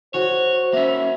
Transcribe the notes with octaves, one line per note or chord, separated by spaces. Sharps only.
F#4 C5 C#5
A#3 C#4 E5